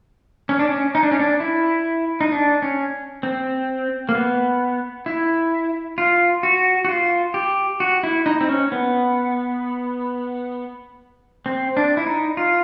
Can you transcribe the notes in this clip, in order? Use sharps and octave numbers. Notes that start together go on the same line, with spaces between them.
C#4
D4
C#4
D#4
D4
C#4
D4
E4
D#4
D4
C#4
C4
A#3
B3
E4
F4
F#4
F#4
F4
G4
F#4
E4
D#4
C4
C#4
B3
C4
D4
E4
D#4
F4